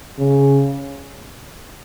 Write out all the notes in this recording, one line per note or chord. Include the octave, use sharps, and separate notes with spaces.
C#3